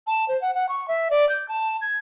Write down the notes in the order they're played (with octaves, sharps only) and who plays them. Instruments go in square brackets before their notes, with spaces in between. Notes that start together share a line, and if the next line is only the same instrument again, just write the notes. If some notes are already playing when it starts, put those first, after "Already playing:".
[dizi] A5
C5
F#5
F#5
C#6
E5
D5
G6
A5
G#6